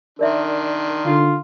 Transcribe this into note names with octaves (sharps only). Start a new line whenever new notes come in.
D#3 D4 A#4 D5 E5 C6
D3 F4